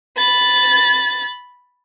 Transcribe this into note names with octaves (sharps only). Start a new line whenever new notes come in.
B5 A6